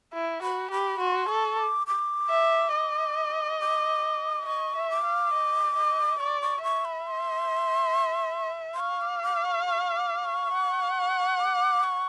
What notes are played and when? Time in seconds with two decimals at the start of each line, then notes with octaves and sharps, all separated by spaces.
0.14 E4
0.43 F#4 B5
0.71 G4 B5
0.99 F#4 C6
1.28 A4 C#6
1.58 D6
1.87 D6
2.30 E5
2.73 D#5
3.60 D6
4.46 D#5 C#6
4.76 E5
4.90 D6
5.04 F5
5.33 D#5
5.76 D#5
6.19 D5 C#6
6.42 C#6
6.63 E5 C#6
6.85 B5
7.07 C6
8.74 C6
8.80 F5 C#6
9.02 D6
9.23 D6
9.45 C#6
9.66 C#6
9.96 D6
10.24 C#6
10.53 F#5
11.40 D6
11.83 C#6